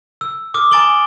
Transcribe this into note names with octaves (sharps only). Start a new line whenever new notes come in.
E6
D6 D#6 F6
G#5 A#5 A6 D7 F#7 G7